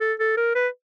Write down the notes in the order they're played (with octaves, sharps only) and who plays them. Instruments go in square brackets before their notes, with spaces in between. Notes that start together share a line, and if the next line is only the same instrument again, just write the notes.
[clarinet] A4
A4
A#4
B4